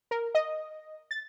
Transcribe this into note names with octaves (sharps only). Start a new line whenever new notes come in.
A#4
D#5
A6